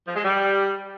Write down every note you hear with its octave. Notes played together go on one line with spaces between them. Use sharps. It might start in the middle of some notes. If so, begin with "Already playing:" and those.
F3
G#3
G3